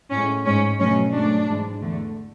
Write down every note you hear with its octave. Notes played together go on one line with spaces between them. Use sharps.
A2 G#3 C#4
G#2 G#3 C#4
B2 F#3 A3 C#4
G#2 F#3 A3 D4
G#2 E3 G#3
E2 D3 A3